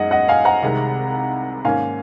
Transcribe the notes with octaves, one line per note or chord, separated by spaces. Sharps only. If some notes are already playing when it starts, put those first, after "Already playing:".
Already playing: F#2 G#3 D#4 D#5 F#5
D#5 F#5
F5 G#5
F#5 A#5
C2 C3 D#3 G#3
G#2 D#3 A#3 C#4 F5 G#5